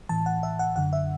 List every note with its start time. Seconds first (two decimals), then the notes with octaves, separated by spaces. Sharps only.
0.09 A2 E3 A5
0.26 F#5
0.43 E5
0.59 F#5
0.76 F#2 D3 F#5
0.93 E5